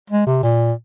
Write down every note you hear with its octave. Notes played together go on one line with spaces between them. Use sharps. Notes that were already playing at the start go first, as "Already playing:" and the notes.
G#3
C3
A#2